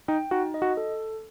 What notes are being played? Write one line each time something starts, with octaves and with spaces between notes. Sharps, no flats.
D#4 G5
D#4 F#4
D#5
F#4
A4